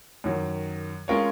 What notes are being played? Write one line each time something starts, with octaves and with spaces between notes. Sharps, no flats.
F#2 D#3 F#3
G#3 C#4 F4 A#4 C#5